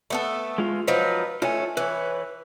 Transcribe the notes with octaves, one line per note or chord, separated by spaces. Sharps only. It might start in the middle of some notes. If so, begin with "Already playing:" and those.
A3 B3 A4
G#3 F4
F3 F#3 D#4 B4
A3 F4 C#5 G#5
E3 B4 C#5